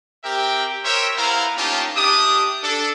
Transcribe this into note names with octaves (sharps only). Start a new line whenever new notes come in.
C4 G4 A#4 E5 G5
G4 A#4 C5 C#5 E5 G5
B3 E4 A#4 C5 F5 A#5
A#3 C#4 D#4 F4 G4 A5
D4 G4 E5 D6 D#6
D4 A4